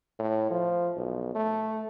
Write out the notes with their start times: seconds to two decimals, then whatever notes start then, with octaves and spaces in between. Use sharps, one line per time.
0.19 A2
0.51 F3
0.96 B1
1.35 A3